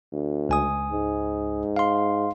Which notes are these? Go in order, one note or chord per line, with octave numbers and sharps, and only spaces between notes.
D2
C#2 G#5 D#6
G#2
F5 C6